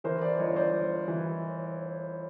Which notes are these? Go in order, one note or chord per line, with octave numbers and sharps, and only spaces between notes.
E3 A#4 C5
C5 D5
G1 C#5 D#5
C5 D5
G1
E3